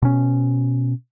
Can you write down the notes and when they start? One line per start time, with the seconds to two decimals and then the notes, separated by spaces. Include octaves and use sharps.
0.02 B2 C#4